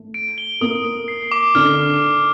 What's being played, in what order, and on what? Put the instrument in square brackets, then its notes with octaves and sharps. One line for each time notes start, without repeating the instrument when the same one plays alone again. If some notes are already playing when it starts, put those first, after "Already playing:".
Already playing: [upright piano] A3
[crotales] D7
G7
[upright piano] A#3 A#4 [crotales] D#6
[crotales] D#6
C7
D6
[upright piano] D3 D4 [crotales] F6